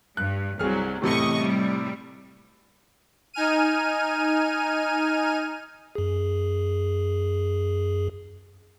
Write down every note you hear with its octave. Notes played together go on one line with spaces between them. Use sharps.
G2 F#6
C2 F#3 G#4 F6
E2 A2 C3 A3 D#5 C#6
G3
D#4 G#5 F6 D#7
F#2 G#4